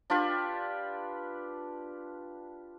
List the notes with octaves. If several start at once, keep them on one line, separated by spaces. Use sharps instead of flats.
D4 F4 G4 B4